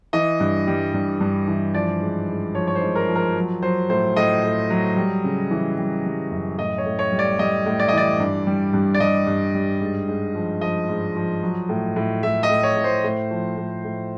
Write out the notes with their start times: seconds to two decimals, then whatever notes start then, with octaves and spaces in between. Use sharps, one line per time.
0.13 E3 D#5
0.40 G2
0.67 G3
0.94 G2
1.20 G2
1.48 E3
1.74 F3 D5
2.01 G#2
2.28 G#2
2.55 F3 C#5
2.67 C#5
2.75 C5
2.82 G#2
2.95 A#4
3.09 F3
3.15 A#4
3.36 F#3
3.62 F#3 C5
3.89 A2 C5
4.16 A2 D#5
4.44 A2
4.70 F#3
4.97 G3
5.24 C#3
5.51 E3
5.78 G3
6.05 G3
6.31 F#2
6.58 A2 D#5
6.78 C#5
6.86 A2
6.99 C#5
7.12 G3
7.19 D5
7.39 G3 D#5
7.66 A2
7.80 D5
7.88 D#5
7.93 E3 D5
8.20 G2
8.47 G3
8.73 G2
8.94 D5
9.00 G2 D#5
9.27 G2
9.54 G3
9.81 G#2
10.08 G#2
10.35 F3
10.61 F3 D#5
10.89 G#2
11.16 F3
11.43 F#3
11.69 A2
11.96 A2
12.23 A2 E5
12.43 D#5
12.50 A2
12.63 C#5
12.77 A2
12.84 C5
13.04 A2
13.31 F3
13.57 A2
13.84 A2